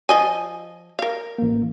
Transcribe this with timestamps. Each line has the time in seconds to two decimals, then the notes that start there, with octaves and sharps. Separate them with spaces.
0.09 F3 D#5 G#5
0.99 A#4 F5
1.38 A1 A#3